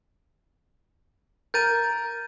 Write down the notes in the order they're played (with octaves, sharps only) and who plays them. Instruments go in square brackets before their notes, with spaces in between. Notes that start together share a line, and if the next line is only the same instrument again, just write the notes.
[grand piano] A#4 [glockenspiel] G6 A6 D#7